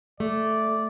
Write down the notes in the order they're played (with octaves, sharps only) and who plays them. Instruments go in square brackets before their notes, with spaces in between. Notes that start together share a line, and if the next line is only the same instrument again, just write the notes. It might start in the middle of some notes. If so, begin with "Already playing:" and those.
[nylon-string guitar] A3 [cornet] D5